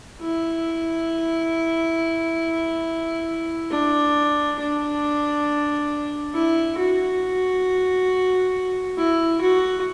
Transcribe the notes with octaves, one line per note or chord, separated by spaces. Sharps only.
E4
D4
D4
E4
F#4
E4
F#4